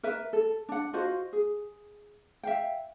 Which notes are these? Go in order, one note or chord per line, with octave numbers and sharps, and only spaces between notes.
A#4 B4 E5
A4
D4 F#5
F4 F#4 C5 D#5
G#4
E5 F5 G5